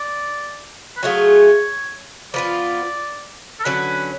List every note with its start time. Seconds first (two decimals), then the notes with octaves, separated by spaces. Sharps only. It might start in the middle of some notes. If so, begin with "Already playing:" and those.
Already playing: D5
0.97 B4
1.03 F#3 A3 F4 G#4 C#5
2.34 F3 B3 F4 D5
3.60 A4
3.65 D3 F#3 C#4 B4